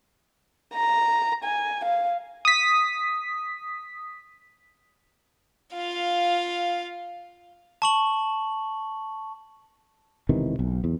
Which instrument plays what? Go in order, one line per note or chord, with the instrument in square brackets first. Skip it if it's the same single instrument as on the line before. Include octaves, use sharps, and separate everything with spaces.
[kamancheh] A#5
G#5
F5
[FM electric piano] D#6 B6
[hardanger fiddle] F4 F5
[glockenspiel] A5 C#6 F#7
[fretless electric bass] E1 C3 D#3 E3
B1
E2